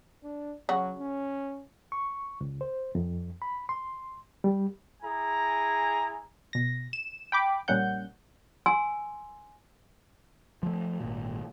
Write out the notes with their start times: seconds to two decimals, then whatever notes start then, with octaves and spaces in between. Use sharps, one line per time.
0.24 D4
0.69 C#3 F#3 F#4
0.99 C#4
1.92 C#6
2.41 C#2
2.61 C5
2.95 F2
3.42 B5
3.69 C6
4.44 G3
5.02 E4 G#4 G#5 A#5
6.53 B2 A#6
6.93 E7
7.32 G5 B5 D6
7.68 A#1 G3 A#3 C#4 F#5 G6
8.66 G#5 C6 E6
10.63 F3 A3
11.00 G#1 A#2